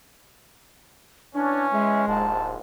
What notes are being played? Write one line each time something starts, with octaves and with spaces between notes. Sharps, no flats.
E3 C#4 D4
G#3 E5
D1 A#1 D#2 G#2 A5